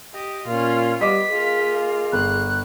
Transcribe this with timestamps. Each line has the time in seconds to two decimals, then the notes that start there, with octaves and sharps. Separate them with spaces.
0.14 G4 D#5
0.47 A#2 C#4 F4
1.01 G3 B3 D#5 D6 B6
1.31 A#3 F4 G#4
2.12 G1 F#6